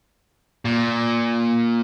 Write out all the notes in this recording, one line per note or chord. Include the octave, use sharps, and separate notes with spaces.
A#2